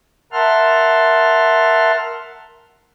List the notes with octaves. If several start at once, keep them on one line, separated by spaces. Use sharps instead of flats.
A#4 E5 F#5 A5 C6 F6